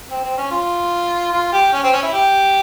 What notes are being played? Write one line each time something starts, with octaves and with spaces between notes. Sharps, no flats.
C4
C4
C#4
F4
F4
G4
C#4
C4
C#4
E4
G4